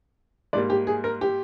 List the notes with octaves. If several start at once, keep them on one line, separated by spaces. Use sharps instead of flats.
G#2 G3 A#3 D5
G4
G#4
A#4
G4